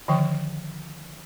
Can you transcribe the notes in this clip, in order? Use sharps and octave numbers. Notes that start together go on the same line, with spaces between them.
D3 D#3 F3 G5 C#6